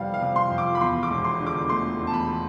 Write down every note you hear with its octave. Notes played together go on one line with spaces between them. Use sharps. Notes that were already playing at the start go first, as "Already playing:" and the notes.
Already playing: F2 C3 E3 G3 F5
F5
C3
C6
F2
D6
B5
E2 C6
D6
E1
C6
D3
D6
A3 C6
E2
A5
B5